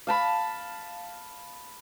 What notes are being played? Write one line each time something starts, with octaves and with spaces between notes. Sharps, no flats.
F5 A5 B5